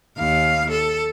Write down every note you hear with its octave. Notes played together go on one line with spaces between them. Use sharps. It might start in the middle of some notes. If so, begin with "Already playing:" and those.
D#2 F5
A4